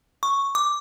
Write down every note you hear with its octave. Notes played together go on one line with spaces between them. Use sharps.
C#6
D6